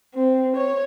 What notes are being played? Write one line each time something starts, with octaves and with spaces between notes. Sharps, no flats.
C4
C#5